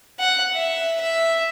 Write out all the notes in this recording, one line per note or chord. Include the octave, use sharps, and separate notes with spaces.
F#5
E5
E5